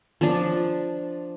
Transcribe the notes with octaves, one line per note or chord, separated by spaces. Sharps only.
F3 D4